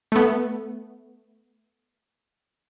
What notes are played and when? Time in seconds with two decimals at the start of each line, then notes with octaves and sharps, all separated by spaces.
0.12 A3 B3